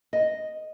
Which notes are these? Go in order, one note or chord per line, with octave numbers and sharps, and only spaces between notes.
D#5